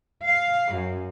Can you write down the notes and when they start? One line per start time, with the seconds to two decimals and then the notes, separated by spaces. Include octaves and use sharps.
0.24 F5
0.70 F#2